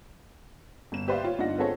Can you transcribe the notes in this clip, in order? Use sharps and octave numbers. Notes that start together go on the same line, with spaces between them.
G1 E7
G4 B4 C5 D5 E5 F5
F4 C#5
G1 D4 D#4 F4 F#5 A#6
B3 C4 F4 G#4 A4 C#5